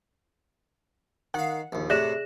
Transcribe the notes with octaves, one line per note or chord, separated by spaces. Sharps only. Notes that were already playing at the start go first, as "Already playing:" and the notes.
D#3 F5 F#5
A#1 D#2
A2 C3 G#4 D5 E5 F#6 A#6 E7